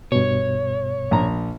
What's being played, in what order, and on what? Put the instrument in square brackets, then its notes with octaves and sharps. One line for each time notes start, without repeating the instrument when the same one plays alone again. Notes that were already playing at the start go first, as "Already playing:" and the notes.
[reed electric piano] G2 B2 [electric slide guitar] C#5
[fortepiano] A#1 A#5